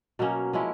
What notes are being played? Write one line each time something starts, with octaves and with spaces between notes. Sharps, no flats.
B2 F#3 A#3 C#4
F3 G#3 C#4 E4